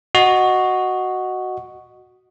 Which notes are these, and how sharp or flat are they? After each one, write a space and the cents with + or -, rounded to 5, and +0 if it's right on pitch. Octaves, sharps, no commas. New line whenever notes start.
F#4 +0 D#5 -10